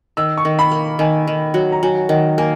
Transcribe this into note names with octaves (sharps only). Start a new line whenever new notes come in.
D#3 E6
C#6
D#3
B5
A#3
D#3 G#5
D#3
F#3
A#5
F#3 G#5
D#3 F#5
A#3 G#5